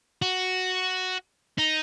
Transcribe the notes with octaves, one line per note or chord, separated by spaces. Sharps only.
F#4
D#4